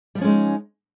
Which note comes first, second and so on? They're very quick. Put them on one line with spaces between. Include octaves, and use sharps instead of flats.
G3 F3 C#4 G#3 D#4